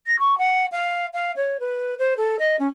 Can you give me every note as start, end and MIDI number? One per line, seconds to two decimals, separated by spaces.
0.06 0.18 94
0.19 0.38 85
0.38 0.66 78
0.72 1.06 77
1.13 1.32 77
1.36 1.57 73
1.60 1.94 71
1.98 2.14 72
2.17 2.36 69
2.39 2.56 75
2.59 2.67 61